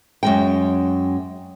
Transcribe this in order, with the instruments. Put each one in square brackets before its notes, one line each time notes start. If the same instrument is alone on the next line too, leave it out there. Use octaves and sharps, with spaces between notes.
[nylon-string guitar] F#2 G#3 G5